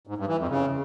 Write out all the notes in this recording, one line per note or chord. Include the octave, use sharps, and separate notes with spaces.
G#2
G2
E3
F2
C#3